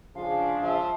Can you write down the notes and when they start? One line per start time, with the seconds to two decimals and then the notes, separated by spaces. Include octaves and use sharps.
0.16 C#3 F3 G#3 D4 F5
0.63 F3 E5